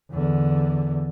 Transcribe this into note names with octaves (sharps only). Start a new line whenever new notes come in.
E2 D3